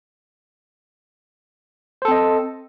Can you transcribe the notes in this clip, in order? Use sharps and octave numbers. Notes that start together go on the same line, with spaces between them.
C4 A4 C5 D#5